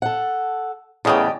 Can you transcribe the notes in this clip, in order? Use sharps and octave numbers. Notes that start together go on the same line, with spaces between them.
A4 F#5
E2 A2 C#3 G4 D5 D#5 D#6